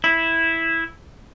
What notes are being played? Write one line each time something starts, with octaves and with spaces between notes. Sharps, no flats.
E4